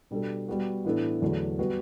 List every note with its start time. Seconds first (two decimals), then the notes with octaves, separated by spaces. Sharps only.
0.11 B2 G3 D4 A4
0.48 G3 B3 F#4
0.85 A2 E3 B3 D4 A4
1.22 E2 D3 F#3 A3 D4
1.59 G3 B3 F#4 B4